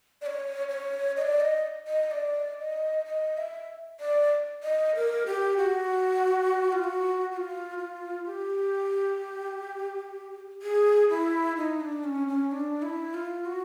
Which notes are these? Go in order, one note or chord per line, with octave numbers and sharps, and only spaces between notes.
D5
C#5
C#5
D#5
D5
D#5
D#5
D5
D#5
D#5
E5
D5
D#5
A#4
G4
F#4
F4
F#4
F#4
F4
F4
G4
G#4
E4
D#4
D4
C#4
C#4
D4
E4
F4
F#4